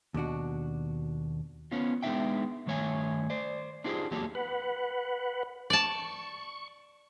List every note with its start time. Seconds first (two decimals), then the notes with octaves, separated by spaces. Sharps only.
0.14 D#2 B2 D4 F#4
1.71 B3 C#4 F4
2.03 G#3 B3 D4 D#4 E5 G5
2.66 G2 D#3 A3 C#5 E5 G#5
3.30 C5 D5
3.84 D4 D#4 F4 G4 G#4 C5
4.11 E2 F#3 A3 A#3 G4 A5
4.35 B4 F#5
5.70 D5 A5 C#6